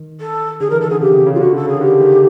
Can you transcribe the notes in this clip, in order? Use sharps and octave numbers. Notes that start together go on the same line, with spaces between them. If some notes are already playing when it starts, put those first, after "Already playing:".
Already playing: D#3
A4
D3 G#4
A#4
E3
D#3 A4
D3 G#4
C#3 G4
C3
C#3
F4
D3 F#4
C#3 A4
C#3 G#4
D#3
D3 G4
D#3